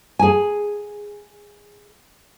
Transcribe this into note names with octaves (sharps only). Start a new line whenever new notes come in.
G#4 G#5